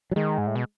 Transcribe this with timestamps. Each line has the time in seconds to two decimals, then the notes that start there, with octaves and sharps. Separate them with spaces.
0.11 F#3
0.16 D#3 G#3
0.38 G#2
0.47 A2
0.56 B2